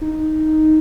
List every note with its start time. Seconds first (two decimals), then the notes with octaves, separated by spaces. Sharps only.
0.01 D#4